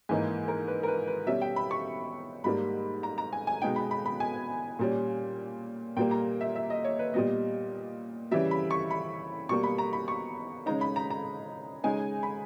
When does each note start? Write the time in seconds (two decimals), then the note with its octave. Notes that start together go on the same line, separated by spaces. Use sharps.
0.09 G#2 E3 A#3 D#4 G#5
0.48 A#4
0.68 B4
0.83 A#4
0.88 B4
1.07 B4
1.26 B2 G3 C#4 E5
1.41 G5
1.56 B5
1.71 C#6
2.44 G#2 G3 A#3 B5
3.03 A#5
3.18 A#5
3.33 G#5
3.47 G#5
3.61 B2 G#3 B3 D#4 G5
3.76 B5
3.91 B5
4.06 B5
4.20 G#5
4.79 A#2 G3 C#4
5.97 A#2 G3 A#3 G5
6.11 A#5
6.41 E5
6.55 E5
6.70 D#5
6.84 C#5
6.99 B4
7.14 A#2 G3 B3 D#5
8.31 C#3 E3 G3 E5
8.51 B5
8.71 C#6
8.91 B5
9.49 B2 G3 A#3 C#6
9.63 B5
9.78 A#5
9.93 B5
10.08 C#6
10.66 C#3 G#3 D#4 A#5
10.81 B5
10.96 A#5
11.10 A#5
11.84 C#3 G#3 D#4 G#5
12.23 B5